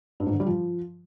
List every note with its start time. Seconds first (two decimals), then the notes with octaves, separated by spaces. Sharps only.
0.20 G2
0.27 G#2
0.33 D3
0.40 G3
0.47 F3